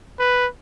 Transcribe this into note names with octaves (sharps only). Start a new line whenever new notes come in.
B4